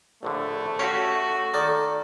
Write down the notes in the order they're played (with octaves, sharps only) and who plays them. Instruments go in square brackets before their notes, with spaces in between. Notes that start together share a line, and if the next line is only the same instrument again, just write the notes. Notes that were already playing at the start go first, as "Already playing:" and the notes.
[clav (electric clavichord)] A#1 A2 D3 [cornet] A3
[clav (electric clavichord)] C#4 G4 F5 [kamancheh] F#4 [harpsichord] C#5
[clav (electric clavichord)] D#3 [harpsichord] A4 D5